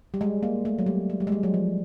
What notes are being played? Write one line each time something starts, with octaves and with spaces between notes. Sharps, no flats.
G3
G#3
A#3
A3
F#3
G3
G#3
G3
G#3
G3
F#3
F3